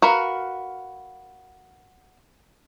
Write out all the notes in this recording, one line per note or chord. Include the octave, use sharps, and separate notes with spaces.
F#4 A#4 B4 F5